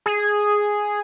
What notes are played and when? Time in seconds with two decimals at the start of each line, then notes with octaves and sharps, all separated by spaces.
0.06 G#4